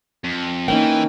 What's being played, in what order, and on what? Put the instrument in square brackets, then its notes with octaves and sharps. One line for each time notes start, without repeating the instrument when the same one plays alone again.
[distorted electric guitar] F2
[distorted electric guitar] E3 [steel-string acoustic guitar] A#3 C#4 D#4 [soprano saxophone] G5